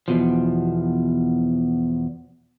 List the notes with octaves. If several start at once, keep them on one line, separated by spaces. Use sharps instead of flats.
E2 B2 F3